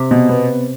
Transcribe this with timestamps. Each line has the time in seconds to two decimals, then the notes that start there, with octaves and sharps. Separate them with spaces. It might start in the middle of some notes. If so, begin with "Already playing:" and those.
Already playing: C3
0.11 B2
0.29 B3